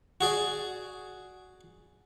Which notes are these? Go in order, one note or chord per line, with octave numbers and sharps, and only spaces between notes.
F#4 G#4 D5